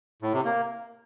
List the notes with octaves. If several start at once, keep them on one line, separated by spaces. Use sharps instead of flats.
A2
C3
A#3